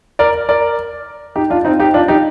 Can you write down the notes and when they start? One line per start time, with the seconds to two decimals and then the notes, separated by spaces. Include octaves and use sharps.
0.19 A#4 D5
0.49 A#4 D5
1.36 D#4 G4
1.50 D4 F4
1.65 C4 D#4
1.80 D#4 G4
1.94 D4 F4
2.08 D#4 G4